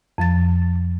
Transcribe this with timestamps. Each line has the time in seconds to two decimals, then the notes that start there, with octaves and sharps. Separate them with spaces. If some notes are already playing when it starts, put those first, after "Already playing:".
0.18 F2 F3 A6